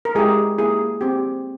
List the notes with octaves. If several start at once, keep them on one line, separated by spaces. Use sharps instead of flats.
A#4
G#3 E4 G4 G#4
A#3 E4 G4 G#4
C4 G4